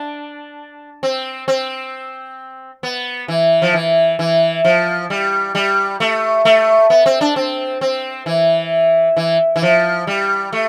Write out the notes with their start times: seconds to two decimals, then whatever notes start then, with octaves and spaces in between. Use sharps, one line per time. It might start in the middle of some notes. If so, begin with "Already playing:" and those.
Already playing: D4
1.03 C4
1.48 C4
2.83 B3
3.28 E3
3.62 F3
3.74 E3
4.19 E3
4.64 F3
5.10 G3
5.55 G3
6.00 A3
6.45 A3
6.90 B3
7.06 C4
7.21 D4
7.36 C4
7.81 C4
8.26 E3
9.17 E3
9.56 E3
9.62 F3
10.07 G3
10.53 A3